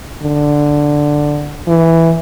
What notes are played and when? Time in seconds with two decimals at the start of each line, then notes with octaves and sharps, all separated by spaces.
0.23 D3
1.67 E3